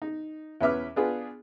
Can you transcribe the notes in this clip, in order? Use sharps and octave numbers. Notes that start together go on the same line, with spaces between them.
D#4
E2 C#4 B4 E5 D6 F6
B3 D4 F4 G#4 B4